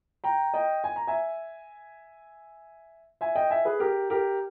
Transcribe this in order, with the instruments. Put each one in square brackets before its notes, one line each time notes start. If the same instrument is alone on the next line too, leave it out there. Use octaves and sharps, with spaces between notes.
[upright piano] G5 A#5
D#5 G5
G#5
A#5
E5 G#5
E5 G#5
D#5 G5
E5 G#5
G#4 B4
G4 A#4
G4 A#4